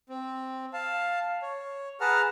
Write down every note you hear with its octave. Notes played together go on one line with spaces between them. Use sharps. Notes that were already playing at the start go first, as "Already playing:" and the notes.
C4
F5 A5
C#5
G#4 B4 F#5 A5 A#5 F6